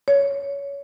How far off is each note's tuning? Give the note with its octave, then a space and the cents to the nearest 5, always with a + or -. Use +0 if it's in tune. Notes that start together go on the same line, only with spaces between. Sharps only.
C#5 +20